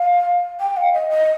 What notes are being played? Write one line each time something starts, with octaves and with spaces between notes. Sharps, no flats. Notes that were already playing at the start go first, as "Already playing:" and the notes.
Already playing: F5
G5
F5
D#5
D#5